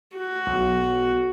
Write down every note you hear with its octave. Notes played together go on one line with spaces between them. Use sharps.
F#4
B1